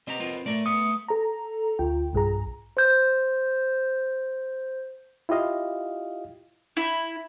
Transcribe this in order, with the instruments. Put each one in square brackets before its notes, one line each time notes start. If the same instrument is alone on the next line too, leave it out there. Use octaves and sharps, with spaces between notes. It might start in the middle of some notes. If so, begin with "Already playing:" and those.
[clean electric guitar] C4 G4 A#5 [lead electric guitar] B4 D#5
[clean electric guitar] C4 F4 A#4
[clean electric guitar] A2 A#4 D5 [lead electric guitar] A3
[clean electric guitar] B3 [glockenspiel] D#6
[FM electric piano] A4 A#5
D2 F4 G5
B1 G2 G#4 A#5
[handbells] C5 G6
[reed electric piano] E4 F4 G4 D#5 F5
[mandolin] E4